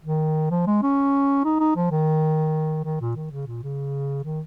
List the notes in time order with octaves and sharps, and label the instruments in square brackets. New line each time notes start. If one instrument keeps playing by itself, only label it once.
[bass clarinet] D#3
F3
G#3
C#4
D#4
D#4
F3
D#3
D#3
A#2
D#3
C#3
A#2
C#3
D#3